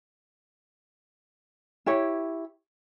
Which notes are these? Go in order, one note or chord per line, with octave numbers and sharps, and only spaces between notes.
E4 G4 C#5